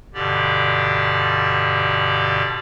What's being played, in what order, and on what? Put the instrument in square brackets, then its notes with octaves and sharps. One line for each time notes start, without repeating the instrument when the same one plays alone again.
[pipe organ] G2 B2 D3 G4 D5